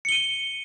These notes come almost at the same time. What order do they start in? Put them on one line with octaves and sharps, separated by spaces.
C#7 G7 D#7